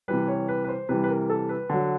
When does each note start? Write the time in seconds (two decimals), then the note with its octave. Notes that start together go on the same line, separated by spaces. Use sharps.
0.08 C3 E3 G3 B4
0.28 C#5
0.48 B4
0.64 B4
0.69 C5
0.89 C3 E3 G3 B4
1.04 B4
1.09 A#4
1.30 A4
1.49 B4
1.69 D3 F#3